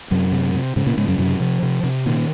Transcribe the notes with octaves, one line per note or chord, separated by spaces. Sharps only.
F#2 C3 F#3
C3
C3
G#2 C#3 G#3
A#2 A#3
G#2 C#3 G#3
F#2 F#3
F#2 C3 F#3
C3 F3
C3
C3
A#2 D#3